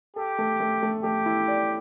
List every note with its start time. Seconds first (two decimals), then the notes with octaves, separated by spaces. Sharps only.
0.16 G4 A4
0.39 A3
0.60 A3
0.83 A3
1.04 A3 G4
1.26 E4
1.48 D5